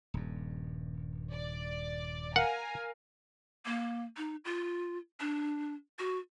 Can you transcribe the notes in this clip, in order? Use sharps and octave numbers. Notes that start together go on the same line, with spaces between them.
D#1 G2
D5
A#4 F5 F#5 G#5 A#5
A#3
D#4
F4
D4
F#4